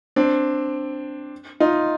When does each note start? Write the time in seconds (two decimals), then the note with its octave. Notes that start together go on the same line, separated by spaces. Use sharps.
0.16 C4 D4
1.60 D#4 F4